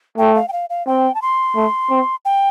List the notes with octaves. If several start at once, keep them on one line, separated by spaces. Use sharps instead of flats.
A3 G5
F5
G5
F5
F5
C4 G5
A5
C6
A3
C4
G5